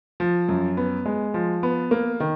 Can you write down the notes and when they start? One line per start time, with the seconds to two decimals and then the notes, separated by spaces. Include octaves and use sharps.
0.20 F3
0.49 F#2
0.77 B3
1.06 G#3
1.34 F3
1.63 B3
1.91 A#3
2.20 D#3